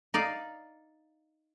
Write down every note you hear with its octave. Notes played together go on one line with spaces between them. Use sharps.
D#4 D5 F5